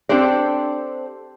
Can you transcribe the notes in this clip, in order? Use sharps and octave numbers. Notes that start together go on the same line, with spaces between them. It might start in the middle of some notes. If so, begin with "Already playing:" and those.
C4 D4 G4 A4 C5 D5